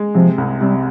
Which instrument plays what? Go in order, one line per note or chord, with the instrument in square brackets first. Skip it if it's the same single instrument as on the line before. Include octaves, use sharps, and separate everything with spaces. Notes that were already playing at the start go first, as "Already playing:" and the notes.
Already playing: [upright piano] G#3
[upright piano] C3 [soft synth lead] F3
[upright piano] C2
[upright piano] C3 [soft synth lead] G3